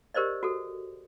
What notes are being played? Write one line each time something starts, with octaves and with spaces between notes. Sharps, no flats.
G4 A#4 C5 D5 D#5
F#4 A4